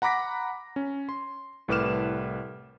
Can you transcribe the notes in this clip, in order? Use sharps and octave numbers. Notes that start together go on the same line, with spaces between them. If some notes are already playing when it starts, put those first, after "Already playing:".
F#5 A#5 B5 D6 A#6 B6
C#4
C6
C2 A2 B4 D6 F6 E7